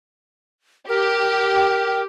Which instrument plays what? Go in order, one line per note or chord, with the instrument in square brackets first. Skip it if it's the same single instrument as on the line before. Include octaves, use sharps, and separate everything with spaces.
[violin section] G4 [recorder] A#4